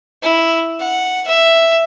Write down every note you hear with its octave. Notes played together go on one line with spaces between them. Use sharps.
E4
F#5
E5